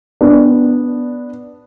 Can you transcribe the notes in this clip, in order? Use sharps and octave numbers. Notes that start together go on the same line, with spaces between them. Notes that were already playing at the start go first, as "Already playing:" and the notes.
B3 D4